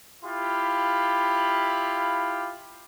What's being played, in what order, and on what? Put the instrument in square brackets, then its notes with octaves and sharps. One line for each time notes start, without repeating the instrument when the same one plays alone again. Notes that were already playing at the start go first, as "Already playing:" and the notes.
[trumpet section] E4 F4 G4 F5 B5